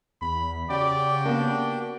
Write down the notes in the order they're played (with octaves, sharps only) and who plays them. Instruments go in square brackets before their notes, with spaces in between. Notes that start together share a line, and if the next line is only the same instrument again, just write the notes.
[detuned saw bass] E2 [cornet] B5
[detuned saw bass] C#3 [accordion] F#4 G4 G5 [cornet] D5
[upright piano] A#3 B3 [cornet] D4